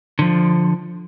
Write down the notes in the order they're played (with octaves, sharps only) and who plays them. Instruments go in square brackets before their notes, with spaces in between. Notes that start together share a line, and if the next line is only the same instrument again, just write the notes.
[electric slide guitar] D3 F3